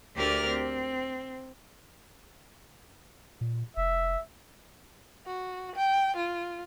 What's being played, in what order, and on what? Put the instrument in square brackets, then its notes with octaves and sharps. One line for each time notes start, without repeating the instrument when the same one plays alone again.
[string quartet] D2 A3 G4 A#4 D5 F6
C4
[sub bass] A#2
[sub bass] F1 [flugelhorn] E5
[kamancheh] F#4
G5
F4